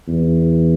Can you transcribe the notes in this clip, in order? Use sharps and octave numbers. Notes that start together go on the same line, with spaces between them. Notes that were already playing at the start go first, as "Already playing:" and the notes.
E2